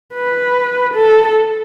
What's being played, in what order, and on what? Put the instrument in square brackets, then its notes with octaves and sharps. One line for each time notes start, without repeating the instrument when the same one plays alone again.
[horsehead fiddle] B4
A4